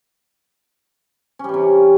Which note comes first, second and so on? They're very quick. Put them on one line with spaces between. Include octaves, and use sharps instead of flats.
C#4 G3 E3 C3